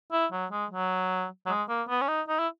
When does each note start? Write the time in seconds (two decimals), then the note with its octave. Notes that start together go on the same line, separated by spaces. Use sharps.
0.12 E4
0.32 F#3
0.51 G#3
0.71 F#3
1.46 F#3
1.49 G#3
1.69 A#3
1.89 B3
2.01 C#4
2.08 D#4
2.28 D#4
2.39 E4